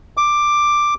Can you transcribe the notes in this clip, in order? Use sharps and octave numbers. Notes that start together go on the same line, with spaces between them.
D6